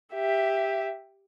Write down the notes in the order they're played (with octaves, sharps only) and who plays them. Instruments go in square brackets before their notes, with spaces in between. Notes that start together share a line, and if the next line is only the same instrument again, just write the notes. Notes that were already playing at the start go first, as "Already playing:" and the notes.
[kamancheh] G4 E5